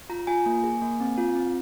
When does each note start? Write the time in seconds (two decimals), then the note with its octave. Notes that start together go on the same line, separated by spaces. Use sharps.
0.09 F4 A#5
0.27 F4 G#5
0.46 A#3
0.64 G#4
0.82 A#3
1.00 C4
1.18 F4
1.36 C4